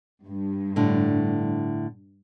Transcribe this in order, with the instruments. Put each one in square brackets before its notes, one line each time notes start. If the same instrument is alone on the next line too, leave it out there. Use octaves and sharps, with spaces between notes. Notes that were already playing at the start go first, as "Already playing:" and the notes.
[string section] G2
[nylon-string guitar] A2 D3